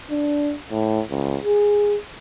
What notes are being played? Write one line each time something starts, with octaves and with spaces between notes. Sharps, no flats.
D4
A2
C#2
G#4